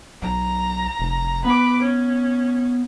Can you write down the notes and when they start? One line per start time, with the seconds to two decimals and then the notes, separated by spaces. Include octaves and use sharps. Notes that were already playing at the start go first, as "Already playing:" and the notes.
0.22 B1 A#5
1.00 F1
1.45 B3 B4 D6
1.82 C#4